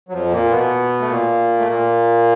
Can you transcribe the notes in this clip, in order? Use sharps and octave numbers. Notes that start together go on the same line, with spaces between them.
F#3
F2 F3
A#2 A#3
B2 B3
A3
A#2 A#3
A3
A#2 A#3